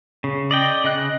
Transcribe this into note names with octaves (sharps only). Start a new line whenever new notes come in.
C#3
D5 D#5 G5
C#3 D#5 F#6